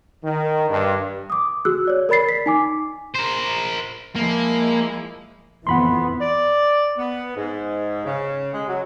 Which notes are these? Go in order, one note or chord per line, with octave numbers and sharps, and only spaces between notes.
D#3
G2
D6 D#6
F#4 G#4 E6 F#6
C#5 D5
A#4 D5 B5 A6 C7
B6
D#4 G#5 D6
A#4 C5
F3 G#3 A#3 E4
F2 E3 B3 F#5 B5 C6
D5
B3
G#2
C#3
G#3
F#3